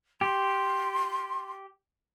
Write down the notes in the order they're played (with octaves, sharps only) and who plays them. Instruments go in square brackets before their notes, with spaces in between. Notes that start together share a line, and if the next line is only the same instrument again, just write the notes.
[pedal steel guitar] G4 [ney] C6